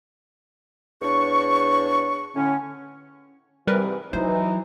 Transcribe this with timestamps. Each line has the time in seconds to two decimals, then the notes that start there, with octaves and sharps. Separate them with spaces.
1.02 E2 D4 C#5 C#6
2.35 A2 D3 C#4
3.67 G#2 C3 E3 G3 A#4 B4
4.13 E3 F#3 D#4 C5